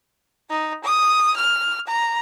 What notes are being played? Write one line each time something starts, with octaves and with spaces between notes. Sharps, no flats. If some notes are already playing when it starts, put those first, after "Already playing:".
D#4
D#6
F6
A#5